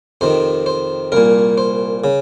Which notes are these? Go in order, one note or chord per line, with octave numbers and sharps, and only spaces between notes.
F2 C3 D#3 C5
C5
C2 A#2 A#4
C5
C#3